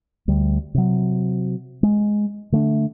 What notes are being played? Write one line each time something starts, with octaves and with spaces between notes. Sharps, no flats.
D2 G3
C3 F#3
G#3
D3 A3 C4 D4